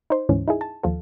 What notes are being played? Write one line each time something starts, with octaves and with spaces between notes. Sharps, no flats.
D#4 C5
D2 G#2 E3 C#4
D#4 E4 G#4
A5
D#2 F3 F4 A4